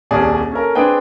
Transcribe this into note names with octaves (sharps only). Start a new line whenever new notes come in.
D#1 C2 C#4 G#4 D5 A5
C#4 A4 A#4
C4 D4 G#4 B4 G5